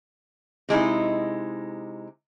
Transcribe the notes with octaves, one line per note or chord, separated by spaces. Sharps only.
C3 G#3 D#4 E4